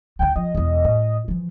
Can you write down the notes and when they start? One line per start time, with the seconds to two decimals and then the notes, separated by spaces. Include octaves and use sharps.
0.19 D2 D3 G5
0.36 F3 D#5
0.55 E1 E2
0.84 A2
1.28 E3 F3